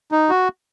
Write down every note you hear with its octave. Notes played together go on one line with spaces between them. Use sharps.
D#4
F#4